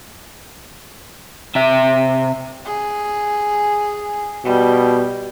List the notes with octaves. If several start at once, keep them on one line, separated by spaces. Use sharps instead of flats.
C3 E5
G#4
B2 G3